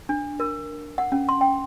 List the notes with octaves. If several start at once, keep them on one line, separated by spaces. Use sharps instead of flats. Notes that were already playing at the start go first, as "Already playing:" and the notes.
D4
A#4
F#5
C#4
C6
G5